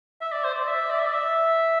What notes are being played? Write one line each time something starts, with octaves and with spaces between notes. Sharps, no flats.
E5
D5
C5
D5
E5
D5
E5
D5
E5